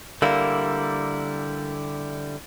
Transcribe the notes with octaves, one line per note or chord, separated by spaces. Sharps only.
D3 G3 A#3 E4